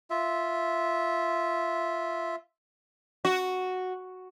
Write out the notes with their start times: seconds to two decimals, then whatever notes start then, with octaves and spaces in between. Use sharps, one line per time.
0.10 F4 E5
3.25 F#4